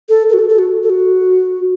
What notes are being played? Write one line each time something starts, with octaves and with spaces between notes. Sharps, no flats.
A4
A#4
F#4
A4
A4
F#4
A4
F#4